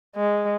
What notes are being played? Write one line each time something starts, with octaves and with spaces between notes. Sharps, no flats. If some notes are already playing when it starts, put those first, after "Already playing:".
G#3